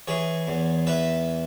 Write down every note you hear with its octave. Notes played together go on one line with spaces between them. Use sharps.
E3 G#4 C#5
E2
E3 B4 E5